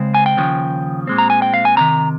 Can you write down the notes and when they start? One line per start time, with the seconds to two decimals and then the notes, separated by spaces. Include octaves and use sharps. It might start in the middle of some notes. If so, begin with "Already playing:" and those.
Already playing: C#2 C#3 G#3 C4
0.15 G#5
0.26 G5
0.37 D#2 C#3 F3
1.07 A#2 G#3 C4
1.18 A#5
1.30 G#5
1.42 G5
1.54 F5
1.65 G#5
1.76 C#2 C3 D#3 A#5